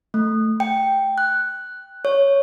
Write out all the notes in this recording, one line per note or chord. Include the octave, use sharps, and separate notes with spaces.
A3
G5
F#6
C#5